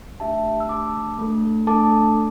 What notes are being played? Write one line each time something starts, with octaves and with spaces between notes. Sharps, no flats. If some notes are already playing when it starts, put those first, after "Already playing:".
A3 D4 G4 E5 A5
E6
A3 D4 G4 A5 D6
A3 D4 A4
A3 D4 A4 A5 D6